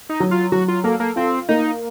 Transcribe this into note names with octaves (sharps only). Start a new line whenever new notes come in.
D#4
F#3
F4
F#3 F#4
F4
A#3 A4
A#3
C4 F4
A#3 D#4